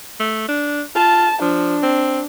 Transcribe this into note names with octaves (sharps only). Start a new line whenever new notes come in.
A3
D4
F4 A5
F3 D4
C4